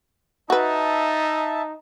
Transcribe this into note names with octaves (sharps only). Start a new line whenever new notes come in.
D#4 F#4 B4 E5 A5